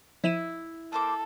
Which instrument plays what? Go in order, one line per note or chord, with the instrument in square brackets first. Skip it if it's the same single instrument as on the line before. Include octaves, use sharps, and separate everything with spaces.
[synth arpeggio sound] F3 D#7 E7 [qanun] E4
[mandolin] A#3 C5 D6 [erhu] A4